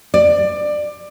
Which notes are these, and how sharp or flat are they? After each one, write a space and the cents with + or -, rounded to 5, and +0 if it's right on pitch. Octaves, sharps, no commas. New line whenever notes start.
D5 +20